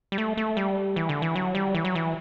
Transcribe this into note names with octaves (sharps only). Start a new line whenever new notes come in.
G3
A3
A3
G3
E3
D3
E3
F#3
G3
E3
F#3
E3